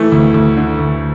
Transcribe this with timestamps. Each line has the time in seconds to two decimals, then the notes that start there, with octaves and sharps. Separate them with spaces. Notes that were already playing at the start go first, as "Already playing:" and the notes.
Already playing: E3 A3
0.12 D2
0.34 D2
0.57 D3
0.79 D2